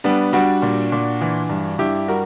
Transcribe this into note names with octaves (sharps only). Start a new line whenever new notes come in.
G3 B3 D4
G3 D4 F#4
A#2
A#2
E3
G2
G2 E4 G4
G3 F#4 A#4